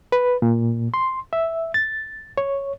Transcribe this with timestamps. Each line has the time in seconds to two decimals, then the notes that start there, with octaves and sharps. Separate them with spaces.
0.12 B4
0.42 A#2
0.94 C6
1.33 E5
1.74 A6
2.38 C#5